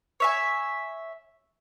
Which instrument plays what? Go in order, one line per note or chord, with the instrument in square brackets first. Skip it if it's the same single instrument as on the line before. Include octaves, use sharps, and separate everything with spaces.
[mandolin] C#5 E5 G#5